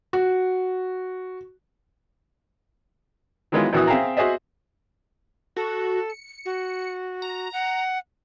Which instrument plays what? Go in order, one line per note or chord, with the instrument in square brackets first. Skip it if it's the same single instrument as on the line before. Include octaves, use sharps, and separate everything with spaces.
[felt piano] F#4
[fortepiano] D#3 E3 F#3 G#3 B3 F4
A#1 B2 E3 B3 F#4 D#6
C4 G#4 E5 F5 G5 A#5
F#4 G#4 C5 D#5 E5
[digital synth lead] F#4 [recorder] A4
[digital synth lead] C#7
[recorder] F#4
[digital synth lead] A#5
[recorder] F#5